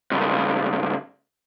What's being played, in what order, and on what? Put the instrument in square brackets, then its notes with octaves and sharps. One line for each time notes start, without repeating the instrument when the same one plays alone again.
[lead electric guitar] C#2 G2